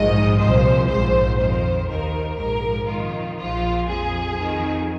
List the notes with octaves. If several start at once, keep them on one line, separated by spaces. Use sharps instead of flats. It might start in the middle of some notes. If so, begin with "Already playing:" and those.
Already playing: A#1 G#2 D#3 D#5
C2 A#2 F3 C5
A#1 G#2 F3 C5
F2 D#3 C5
D#2 D#3 A#4
A#1 G#2 F3 A#4
F2 D#3 F4
A#1 A#2 F3 F4
F2 F3 G#4
F2 D#3